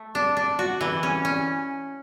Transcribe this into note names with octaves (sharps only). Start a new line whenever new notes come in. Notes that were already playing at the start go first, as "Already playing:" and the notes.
Already playing: A3
D4
D4
F#4
E3
C#4
C#4